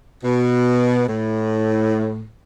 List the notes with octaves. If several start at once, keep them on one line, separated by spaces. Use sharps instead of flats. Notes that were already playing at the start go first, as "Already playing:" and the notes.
B2
A2